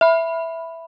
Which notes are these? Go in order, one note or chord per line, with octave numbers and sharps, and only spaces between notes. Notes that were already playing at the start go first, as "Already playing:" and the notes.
E5 B5